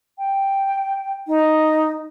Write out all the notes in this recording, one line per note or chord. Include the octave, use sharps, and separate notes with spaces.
G5
D#4